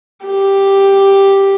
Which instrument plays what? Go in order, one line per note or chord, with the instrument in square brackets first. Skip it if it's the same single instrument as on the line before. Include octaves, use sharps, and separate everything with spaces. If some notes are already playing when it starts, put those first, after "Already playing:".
[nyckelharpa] G4